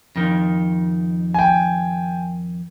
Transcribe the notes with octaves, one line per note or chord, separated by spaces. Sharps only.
F2 D#3
G5 G#5